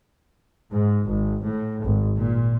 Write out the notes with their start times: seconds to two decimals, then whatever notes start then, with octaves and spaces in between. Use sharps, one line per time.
0.70 G#2
1.05 G#1
1.42 A2
1.84 G#1
2.17 A#2